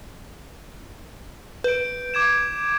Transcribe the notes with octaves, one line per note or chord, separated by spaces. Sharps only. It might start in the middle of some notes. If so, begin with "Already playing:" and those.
B4 G6 D7
D6 G#6 E7